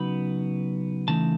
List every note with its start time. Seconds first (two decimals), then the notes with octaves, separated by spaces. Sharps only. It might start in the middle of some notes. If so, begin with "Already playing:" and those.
Already playing: C#3 F#3 B3 D#4 B5
1.08 C#3 E3 A3 D#4 A5